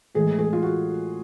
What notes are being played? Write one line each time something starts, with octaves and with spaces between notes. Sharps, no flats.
A2 E3 G#3 G#4
G#4
F4
F#4